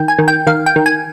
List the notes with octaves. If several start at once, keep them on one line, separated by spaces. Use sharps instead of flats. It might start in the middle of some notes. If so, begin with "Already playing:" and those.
Already playing: D#3 G5
G#5
D#3
G5
D#3 F5
G5
D#3
G#5